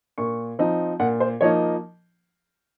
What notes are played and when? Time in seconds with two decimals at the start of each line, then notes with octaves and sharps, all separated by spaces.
0.18 A#2 C#6
0.59 F3 C4 D#4
1.00 A#2 F#5
1.20 C5
1.41 F3 A#3 D#4 C#5